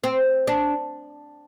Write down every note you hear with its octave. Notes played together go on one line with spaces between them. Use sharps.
C4
D4